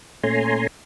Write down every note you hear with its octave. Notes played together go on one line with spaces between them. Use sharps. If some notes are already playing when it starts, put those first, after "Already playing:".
A#2 A3 C#4 G#5 A#5 C6